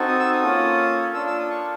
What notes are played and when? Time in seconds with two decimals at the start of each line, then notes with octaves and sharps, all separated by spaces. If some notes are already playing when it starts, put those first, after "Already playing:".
Already playing: C4 D#4 F#4 A4
0.08 D#6
0.19 E6
0.32 D#6
0.43 A#3 C#4 F4 A4
1.14 A#3 D4 F4 A4 E6
1.27 E6
1.38 D#6
1.50 C#6